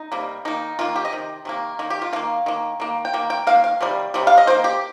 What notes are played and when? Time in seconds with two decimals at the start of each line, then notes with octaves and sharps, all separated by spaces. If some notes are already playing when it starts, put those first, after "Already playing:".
Already playing: D#4
0.12 C3 G3 A#3
0.45 D#3 A#3 D#4
0.79 D#3 A#3 F4
0.96 G4
1.05 D#5
1.12 C3 D#3
1.45 C3 D#3 A#3
1.79 D#3 A#3
1.90 G4
2.02 F4
2.13 D#3 A#3 F5
2.46 D#3 A#3
2.80 D#3 A#3
3.05 G5
3.14 D#3 A#3
3.30 G5
3.47 D#3 A#3 F5
3.64 F5
3.81 C3 D#3 G3
4.14 C3 D#3 G3
4.27 F5
4.38 D#5
4.47 D#3 A#3 C5
4.64 G4